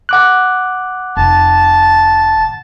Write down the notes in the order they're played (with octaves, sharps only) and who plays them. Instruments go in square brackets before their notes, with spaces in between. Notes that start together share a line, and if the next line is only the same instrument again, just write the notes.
[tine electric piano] F#5 D6 F#6
[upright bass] F1 [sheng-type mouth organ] A5